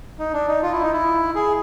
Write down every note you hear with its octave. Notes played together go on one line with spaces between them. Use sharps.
D#4
D4
D#4
F4
E4
D#4
E4
G#4